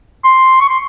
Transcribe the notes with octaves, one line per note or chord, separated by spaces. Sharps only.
C6
C#6
C6